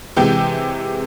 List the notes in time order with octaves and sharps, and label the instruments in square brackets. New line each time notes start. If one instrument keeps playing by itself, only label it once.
[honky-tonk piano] C3 E3 G#3 G5